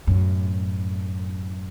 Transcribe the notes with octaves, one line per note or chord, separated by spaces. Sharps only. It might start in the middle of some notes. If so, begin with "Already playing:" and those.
F#2 A2